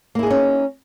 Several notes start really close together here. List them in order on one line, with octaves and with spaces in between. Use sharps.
A#3 E4 G#4 D#4 C#4